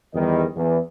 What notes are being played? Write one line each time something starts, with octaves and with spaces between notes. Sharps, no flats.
E2 D#3 G3 D#5
E2